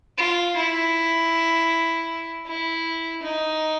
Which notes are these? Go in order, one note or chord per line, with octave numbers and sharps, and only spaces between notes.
F4
E4
E4
D#4